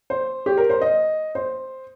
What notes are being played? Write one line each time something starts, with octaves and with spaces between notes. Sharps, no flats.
C5
G4
A#4
C5
D#5
C5